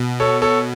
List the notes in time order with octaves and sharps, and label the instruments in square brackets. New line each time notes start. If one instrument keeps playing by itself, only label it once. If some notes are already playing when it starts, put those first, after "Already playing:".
Already playing: [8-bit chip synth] B2
[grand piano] A4 C#5
A4 C#5